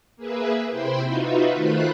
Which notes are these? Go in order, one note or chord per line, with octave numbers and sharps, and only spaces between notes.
A#3 G#4 B4 E5
C3 E4 C5 G5 B5 C6
D#4 F4 F#4 B4 E5
D#3 A3 F4 C5 B5 F#6